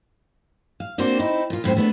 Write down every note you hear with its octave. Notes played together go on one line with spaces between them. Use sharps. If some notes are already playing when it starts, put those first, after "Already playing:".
F5
A#3 C4 D4 F#4 C5
C4 D#4 E4
A#2 F4
F#2 A2 C4 C5
A3 B3 D4 G#4